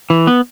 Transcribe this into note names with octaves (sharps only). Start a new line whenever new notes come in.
E3
B3